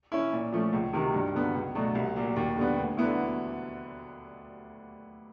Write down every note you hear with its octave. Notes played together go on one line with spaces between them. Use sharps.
C#4 E4
A#2
F3 A3 C#4
C#2
C3 D#3 F#3
G2
D3 F#3 B3
C#2
B2 F#3 A3 D4
C2
A#2 F#3
D#2
D3 G3 B3
D2
D3 F#3 B3 E4